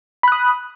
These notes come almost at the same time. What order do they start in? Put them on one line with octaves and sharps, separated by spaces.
B5 F#6 D#6